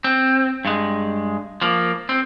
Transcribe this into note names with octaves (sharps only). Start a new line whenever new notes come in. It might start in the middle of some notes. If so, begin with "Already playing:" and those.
C4
G2 G#3
F3 A#3
C4